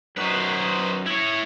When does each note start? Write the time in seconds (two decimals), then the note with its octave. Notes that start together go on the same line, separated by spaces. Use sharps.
0.17 F#2 D#4 F#4 B4 C5
1.07 E4 C#5